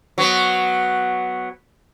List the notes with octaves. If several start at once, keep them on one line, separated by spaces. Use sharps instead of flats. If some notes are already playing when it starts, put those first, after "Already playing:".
F#3 B3